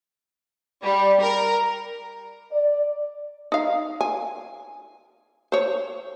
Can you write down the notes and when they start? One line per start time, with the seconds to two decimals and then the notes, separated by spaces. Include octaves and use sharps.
0.84 G3
1.22 A#4
2.51 D5
3.52 D#4 F5
4.01 G#5
5.52 C5 C#5